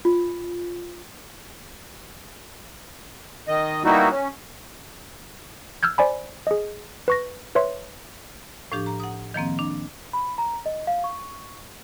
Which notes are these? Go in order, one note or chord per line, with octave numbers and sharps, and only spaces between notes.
F4
D#3 D#5
G3 A#3 B3 D#4 E4 F#4
C#4
E6 F6 G6 G#6
C5 D5 G#5 B5
G#4 D#5
B4 C#6 A#6
B4 C#5 E5 C6
A2 F3 D4 G4
A#5
F#5 D#6
D#3 F3 A#3 C4
D4
B5
A#5
D#5
F5
C#6